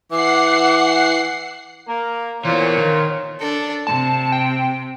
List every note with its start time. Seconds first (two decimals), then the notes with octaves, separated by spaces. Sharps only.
0.11 E3 F#5 D6 C7
1.88 A#3 A#4
2.45 A#2 E3 B3 C5 C#5
2.78 D#3
3.39 D4 A4
3.87 C3 A5
4.32 G5